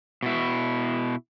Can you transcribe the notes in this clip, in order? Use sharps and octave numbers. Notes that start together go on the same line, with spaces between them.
B2 E4